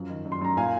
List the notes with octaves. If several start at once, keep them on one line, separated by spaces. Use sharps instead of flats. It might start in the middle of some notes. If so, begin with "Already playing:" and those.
Already playing: F#2 F3
D#3
F#2
C6
F#2 A#5
A#2 F5 G#5